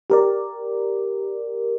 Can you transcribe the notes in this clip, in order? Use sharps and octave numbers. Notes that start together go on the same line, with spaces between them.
G4 A#4 D5